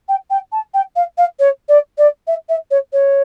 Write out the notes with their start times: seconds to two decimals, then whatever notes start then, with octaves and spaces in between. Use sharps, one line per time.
0.08 G5
0.30 G5
0.52 A5
0.73 G5
0.95 F5
1.17 F5
1.39 C#5
1.68 D5
1.97 D5
2.27 E5
2.49 E5
2.70 C#5
2.92 C#5